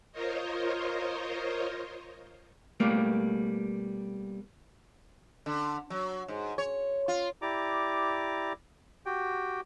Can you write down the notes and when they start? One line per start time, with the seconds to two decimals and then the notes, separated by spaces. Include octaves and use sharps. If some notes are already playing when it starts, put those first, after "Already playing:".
0.12 F4 A#4 C5 C#5 D#5
2.80 B2 G3 A3 A#3
5.46 D3
5.90 F#3
6.28 G#2
6.58 C#5
7.08 F4
7.42 E4 G4 D5 A#5 D6
9.06 F#4 G4 G5